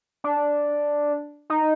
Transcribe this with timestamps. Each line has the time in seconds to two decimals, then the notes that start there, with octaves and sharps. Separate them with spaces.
0.24 D4
1.50 D#4